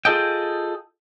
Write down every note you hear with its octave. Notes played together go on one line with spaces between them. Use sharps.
F4 G#4 A4 D#5 G5